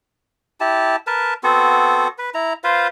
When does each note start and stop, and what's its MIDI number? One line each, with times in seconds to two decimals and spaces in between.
0.60 0.96 64
0.60 0.96 67
0.60 0.96 81
1.07 1.34 70
1.07 1.34 71
1.07 1.34 81
1.43 2.08 59
1.43 2.08 60
1.43 2.08 66
1.43 2.08 69
2.18 2.30 71
2.34 2.53 64
2.34 2.53 82
2.64 2.88 65
2.64 2.88 71
2.64 2.88 72
2.64 2.88 77